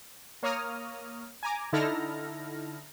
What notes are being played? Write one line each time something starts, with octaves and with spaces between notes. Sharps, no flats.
A#3 C#5 A#5 D#6 F6
G#5 A#5 D6
D3 D#4 E4 A4 F6 A#6